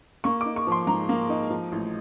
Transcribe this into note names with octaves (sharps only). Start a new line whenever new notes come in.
A#3 C#6
D6
D#4
C#6
F3 C6
G#2 A#5
A#3
D#4
F3
A1